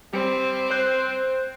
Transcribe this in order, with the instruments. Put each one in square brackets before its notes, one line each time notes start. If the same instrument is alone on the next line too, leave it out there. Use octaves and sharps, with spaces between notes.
[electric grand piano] G3 [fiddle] C4
[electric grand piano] C5 F#6 G6